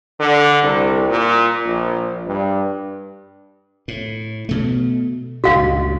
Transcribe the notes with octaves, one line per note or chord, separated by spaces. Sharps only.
D3
C2
A#2
A#1
G2
A2
B2 A3
C#2 G2 A#2 F#4 F5